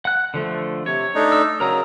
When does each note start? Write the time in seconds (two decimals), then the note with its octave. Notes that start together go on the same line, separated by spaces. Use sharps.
0.05 F#5 F#6
0.34 D3 F3 A3
0.86 C3 C#5
1.15 A3 D4 D#4
1.32 E6
1.60 C#3 F#3 A#4 A#5 D#6